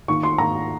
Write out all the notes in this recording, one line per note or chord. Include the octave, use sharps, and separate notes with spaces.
D#3 A#3 C#6
C6
D#3 A#3 A#5